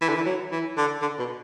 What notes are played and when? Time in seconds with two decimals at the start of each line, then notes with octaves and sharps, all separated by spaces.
0.02 E3
0.09 D3
0.16 E3
0.26 F#3
0.52 E3
0.78 D3
1.02 D3
1.19 B2